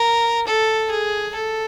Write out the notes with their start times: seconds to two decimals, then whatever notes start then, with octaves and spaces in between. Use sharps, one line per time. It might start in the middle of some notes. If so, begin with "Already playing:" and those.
Already playing: A#4
0.47 A4
0.90 G#4
1.35 A4